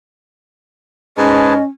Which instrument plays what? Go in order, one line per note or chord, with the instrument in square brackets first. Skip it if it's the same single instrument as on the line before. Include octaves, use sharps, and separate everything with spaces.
[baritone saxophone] G#2 [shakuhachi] C#4 [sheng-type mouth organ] G#4 B4 A5 [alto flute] D#5